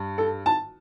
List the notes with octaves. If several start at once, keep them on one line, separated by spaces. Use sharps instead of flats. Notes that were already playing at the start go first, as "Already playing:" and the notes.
Already playing: G2
A4
A5